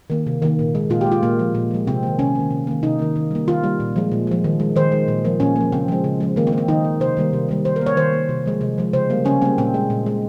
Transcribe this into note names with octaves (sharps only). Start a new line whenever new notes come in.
D#3 A#3
C3
D#3 A#3
A#2
G#3
A#2 F4
G4
G#3
F4
A#2 A#3
F3 G#3
A#2
F3 G#3
C3 C4
D#3 A#3
C3 C#4
D#3 A#3
C3
D#3 A#3
C3 D#4
D#3 A#3
D#3
G3 A#3
D#3 F4
G3 A#3
A#2
F3 G#3
A#2
F3 G#3
D#3
G#3
D#3 C5
G#3
A#2
F3 A#3
A#2 C#4
F3 A#3
C#3 C4
F3 G#3
C#3
F3 G#3
D#3 A#3
C4
A#3
C4
D#3 D#4
A#3
C3 C5
D#3 G3 A#3
C3
D#3 G3 A#3
D#3 C5
A#4
A#3
C#5
D#3 C5
A#3
C3
F3 G#3
C3
F3 G#3
C#3 C5
G3 A#3
C#3 C#4
G3 A#3 C4
A#2 C4
G#3
A#2
G#3